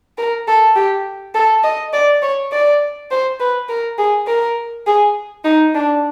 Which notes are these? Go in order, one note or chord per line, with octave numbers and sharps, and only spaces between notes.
A#4
A4
G4
A4
D#5
D5
C#5
D5
C5
B4
A#4
G#4
A#4
G#4
D#4
D4